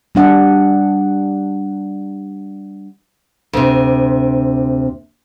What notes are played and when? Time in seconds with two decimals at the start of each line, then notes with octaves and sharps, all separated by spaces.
0.15 G3 D4 F#5
3.53 D2 C3